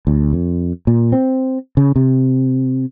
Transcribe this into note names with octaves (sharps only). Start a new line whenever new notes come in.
D2
F2
A#2
C4
C#3
C3